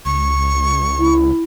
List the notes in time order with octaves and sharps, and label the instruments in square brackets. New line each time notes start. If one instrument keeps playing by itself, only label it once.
[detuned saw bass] C#2 [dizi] C#6
[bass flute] E4